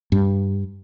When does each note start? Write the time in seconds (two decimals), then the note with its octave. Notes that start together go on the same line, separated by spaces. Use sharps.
0.12 G2